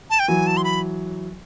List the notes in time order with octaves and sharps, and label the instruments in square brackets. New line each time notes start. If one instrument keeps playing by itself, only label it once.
[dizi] A5
G5
[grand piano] E3 F#3 [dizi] G#5
[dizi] A5
C6
B5